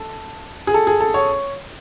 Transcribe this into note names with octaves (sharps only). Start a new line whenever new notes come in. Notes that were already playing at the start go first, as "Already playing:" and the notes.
Already playing: A4
G#4
A4
G#4
A4
C#5